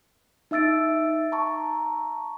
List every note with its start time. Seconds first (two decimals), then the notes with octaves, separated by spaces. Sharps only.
0.51 D#4 E5 E6 A6 D7
1.32 A5 A#5 C#6